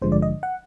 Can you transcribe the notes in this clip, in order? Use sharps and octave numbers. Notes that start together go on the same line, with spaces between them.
A1 G2 D3 F3 G#3 C5
D5
D#5
F#5